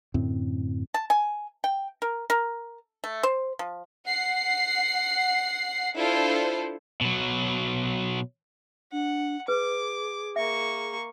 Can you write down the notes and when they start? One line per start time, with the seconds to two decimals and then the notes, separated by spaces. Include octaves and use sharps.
0.14 F#2 A2 D3 C4
0.94 A5
1.10 G#5
1.64 G5
2.02 A#4
2.30 A#4
3.04 A3
3.23 C5
3.59 F3
4.06 F#5 C7
5.96 D4 E4 F4 A4 C5
7.01 B2 F#3
8.92 D4 F#5
9.48 G#4 B4 D6
10.36 A#3 E5 C#6